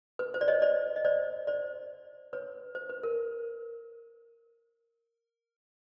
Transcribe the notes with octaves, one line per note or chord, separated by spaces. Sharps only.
B4
C5
D5
C#5 D#5
C5 D5
D#5
C5 D5
C5 D5
B4 C#5
C5
B4
A#4